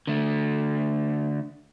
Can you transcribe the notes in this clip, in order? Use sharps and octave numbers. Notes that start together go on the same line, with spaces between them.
D3 A3